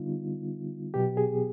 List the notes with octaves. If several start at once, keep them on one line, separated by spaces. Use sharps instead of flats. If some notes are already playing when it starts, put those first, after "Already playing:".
Already playing: D3 G3 B3 D#4 F4
B2 F#3 B3 G4
G#4